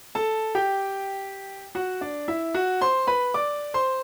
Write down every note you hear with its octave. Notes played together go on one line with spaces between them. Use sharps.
A4 A5
G4 G5
F#4 F#5
D4 D5
E4 E5
F#4 F#5
C5 C6
B4 B5
D5 D6
C5 C6